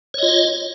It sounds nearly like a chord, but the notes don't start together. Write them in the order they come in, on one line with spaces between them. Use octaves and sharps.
C#5 D#5 F4